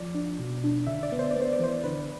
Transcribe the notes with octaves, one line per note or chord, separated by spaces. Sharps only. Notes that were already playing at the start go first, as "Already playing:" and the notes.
Already playing: F3 D5
D4
B2
D4
D3 E5
D5
B3
C5
B3 D5
C5
D5
E3 C5
D3 B4